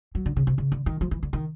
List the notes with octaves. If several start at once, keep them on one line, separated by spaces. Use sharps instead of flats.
F#3
D3
C#3
C3
C#3
D3
D#3
F3
E3
D3
D#3